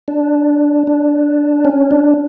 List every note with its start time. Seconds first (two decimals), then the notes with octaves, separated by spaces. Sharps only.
0.08 D4
0.87 D4
1.65 C#4
1.91 D4